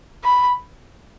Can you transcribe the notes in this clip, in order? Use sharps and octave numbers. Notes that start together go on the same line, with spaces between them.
B5